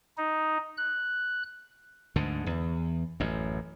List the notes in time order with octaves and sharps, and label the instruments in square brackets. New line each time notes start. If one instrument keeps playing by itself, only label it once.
[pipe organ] D#4
F#6
[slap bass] D2 G#2 D3
E2
A1 F#2